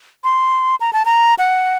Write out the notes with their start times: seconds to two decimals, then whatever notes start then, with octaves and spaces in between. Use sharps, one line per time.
0.24 C6
0.81 A#5
0.93 A5
1.05 A#5
1.39 F#5